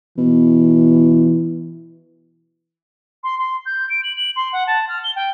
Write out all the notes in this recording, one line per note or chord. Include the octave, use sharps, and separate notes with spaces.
B2 E3
C6
C6
G6
D7
F#7
F#7
C6
F#5
A5
F6
G7
G5